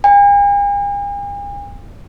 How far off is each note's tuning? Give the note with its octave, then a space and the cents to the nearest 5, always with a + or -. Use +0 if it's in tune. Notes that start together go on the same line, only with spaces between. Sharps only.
G#5 -45